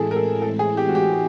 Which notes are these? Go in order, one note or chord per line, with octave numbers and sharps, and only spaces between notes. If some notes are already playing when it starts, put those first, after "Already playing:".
Already playing: A2 E3 G#3 C4 E4 G#4 A4
A#4
A4
A4
G#4
G4
F#4
G4